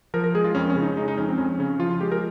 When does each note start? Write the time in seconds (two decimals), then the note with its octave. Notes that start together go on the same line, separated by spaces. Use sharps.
0.14 F3 A#4
0.24 A#4
0.35 G#3 G#4
0.44 F4
0.55 F2 C#4
0.70 C#4
0.75 C#3
0.82 D#4
0.97 G#3 D#4
1.08 D#4
1.17 F2 C#4
1.29 C4
1.38 F2 C#4
1.59 C#3 C#4
1.79 F3 F4
1.91 F4
2.01 G#3 G4
2.12 A#4